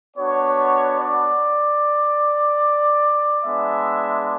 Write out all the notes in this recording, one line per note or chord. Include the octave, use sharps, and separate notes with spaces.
B3 D4 F#4 C#5
D5
G#3 B3 D4 E5